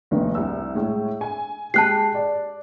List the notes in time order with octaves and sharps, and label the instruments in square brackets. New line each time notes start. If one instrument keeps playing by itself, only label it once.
[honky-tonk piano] F1 D#2 D#4
C2 E6
A2 G#3
G#5
[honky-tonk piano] G#3 G4 [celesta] A5 F#6 C7
[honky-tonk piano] D5